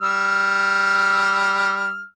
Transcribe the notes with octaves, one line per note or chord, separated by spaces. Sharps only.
G3 E6 F6